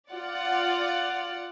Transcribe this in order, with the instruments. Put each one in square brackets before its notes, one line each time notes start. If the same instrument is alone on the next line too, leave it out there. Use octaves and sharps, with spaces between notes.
[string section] F4 D5 F#5